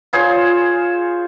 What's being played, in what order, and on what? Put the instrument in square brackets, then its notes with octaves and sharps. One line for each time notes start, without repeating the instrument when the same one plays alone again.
[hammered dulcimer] F4 G#4 C5 C#5